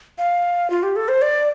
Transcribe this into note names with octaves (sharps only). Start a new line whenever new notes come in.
F5
F4
G4
A4
C5
D5